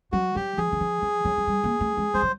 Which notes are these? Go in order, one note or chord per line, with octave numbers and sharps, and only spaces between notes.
F#3 F#4
F#3 G4
F3 G#4
E3
F3
F3
F#3
F#3
G3
A#3
A3
G#3
G3 C5
F#3